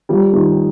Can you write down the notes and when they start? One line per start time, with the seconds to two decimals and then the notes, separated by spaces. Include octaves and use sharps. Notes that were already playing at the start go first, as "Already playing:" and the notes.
0.09 F3 G3
0.33 D#3 F3